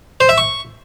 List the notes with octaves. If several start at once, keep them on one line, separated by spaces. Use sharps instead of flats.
C5
E5
C#6